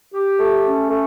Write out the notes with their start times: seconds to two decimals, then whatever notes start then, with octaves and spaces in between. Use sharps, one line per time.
0.14 G4
0.39 A3
0.65 C#4
0.90 A3